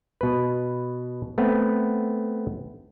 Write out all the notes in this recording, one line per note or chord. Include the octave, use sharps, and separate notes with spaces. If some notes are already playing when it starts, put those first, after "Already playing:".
B2 B4
A3 B3 C4 B4